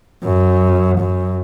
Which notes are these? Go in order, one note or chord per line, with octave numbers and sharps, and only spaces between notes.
F#2
F#2